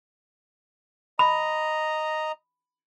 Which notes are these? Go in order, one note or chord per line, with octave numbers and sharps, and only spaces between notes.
D#5 A#5 B5